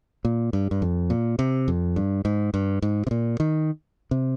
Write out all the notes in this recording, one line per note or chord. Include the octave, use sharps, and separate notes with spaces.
A#2
G2
G2
F2
A#2
C3
F2
G2
G#2
G2
G#2
C3
A#2
D#3
C3